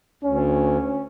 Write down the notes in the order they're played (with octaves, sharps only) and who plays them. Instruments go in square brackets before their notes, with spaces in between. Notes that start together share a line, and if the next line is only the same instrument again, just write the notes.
[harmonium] D2 [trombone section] C#4